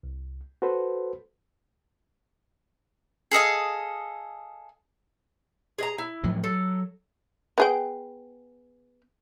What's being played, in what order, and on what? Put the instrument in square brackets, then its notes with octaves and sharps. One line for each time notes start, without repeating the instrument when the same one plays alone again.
[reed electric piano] C2
F#4 A4 B4 C5
[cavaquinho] G#4 A4 D#5 F5
[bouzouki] G#4 D#5 A#5
E4
[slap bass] A2 F3 F#3
[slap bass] F#3 [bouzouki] A4
[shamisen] B3 G#4 G5